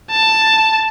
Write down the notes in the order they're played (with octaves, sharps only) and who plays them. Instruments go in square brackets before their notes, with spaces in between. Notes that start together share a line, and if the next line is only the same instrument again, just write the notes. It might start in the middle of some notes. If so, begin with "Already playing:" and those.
[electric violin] A5